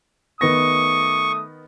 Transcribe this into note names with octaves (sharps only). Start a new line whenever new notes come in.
D#3 A3 B3 C#6 D#6 A#6